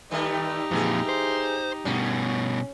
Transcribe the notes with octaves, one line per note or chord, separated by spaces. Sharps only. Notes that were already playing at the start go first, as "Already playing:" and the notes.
D#3 G3 A3 D#4 G4
F2 A#2 E3 G#4
C5
G2 B2 C#4